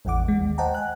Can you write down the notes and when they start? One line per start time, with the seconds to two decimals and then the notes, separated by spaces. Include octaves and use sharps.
0.05 A1 E2 E3 F#5 D6
0.28 G#3
0.41 D#2
0.58 C5 D#5 F#5 G5 A5 A#5
0.75 G#5 F#6